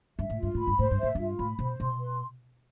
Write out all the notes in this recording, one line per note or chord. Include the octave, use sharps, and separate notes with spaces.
G2 E5
A2
G2 F4
A2 B5
G2
A2 C5
G2
A2 E5
G2 F4
A2 B5
B2 C5
B2 C6
B4